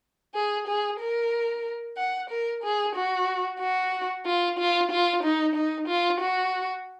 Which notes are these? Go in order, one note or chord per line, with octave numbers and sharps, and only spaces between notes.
G#4
G#4
A#4
F#5
A#4
G#4
F#4
F#4
F4
F4
F4
D#4
D#4
F4
F#4